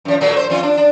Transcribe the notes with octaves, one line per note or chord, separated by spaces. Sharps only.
F#2 F3
A#2 F#3 A3
C5
F2 F4
D4
D4